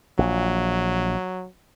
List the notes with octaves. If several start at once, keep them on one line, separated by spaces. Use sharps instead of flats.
A#1 F#3